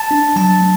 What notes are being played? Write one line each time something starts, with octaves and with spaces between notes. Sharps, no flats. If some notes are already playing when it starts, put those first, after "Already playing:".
Already playing: A5
D4
F#3 A5
A3